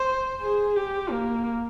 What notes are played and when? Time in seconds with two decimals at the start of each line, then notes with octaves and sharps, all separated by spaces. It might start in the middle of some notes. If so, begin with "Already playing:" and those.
Already playing: C5
0.41 G#4
0.76 G4
1.11 A#3